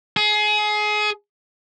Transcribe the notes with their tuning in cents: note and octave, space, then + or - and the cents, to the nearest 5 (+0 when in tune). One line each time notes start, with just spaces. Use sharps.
G#4 +25